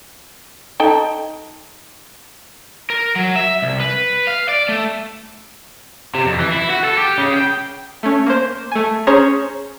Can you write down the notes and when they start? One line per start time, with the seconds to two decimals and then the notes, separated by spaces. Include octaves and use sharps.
0.80 D#4 A4 G5
2.90 A#4
3.16 F#3
3.36 E5
3.62 C2
3.80 B4
4.27 F5
4.49 D5
4.69 A3
6.15 C3
6.27 F2
6.40 E3
6.52 E4
6.70 F#4
6.84 A4
6.98 G4
7.18 C#3
7.34 G5
8.03 A3 C#4
8.26 A#3 C5
8.71 A3 G#5
9.07 C#4 G#4 C5 C#5 A#5